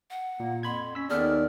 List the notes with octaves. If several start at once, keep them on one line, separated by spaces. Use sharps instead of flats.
F#5
A#2 A#3
F2 B5 C6 G#6
C#4 E6 B6
D#2 D#3 B3 G#4 A4 D5 F6